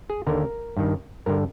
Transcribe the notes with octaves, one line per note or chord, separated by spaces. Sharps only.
G#4
D#2 D3 A#4
G2 D#3
G2 D3 A#4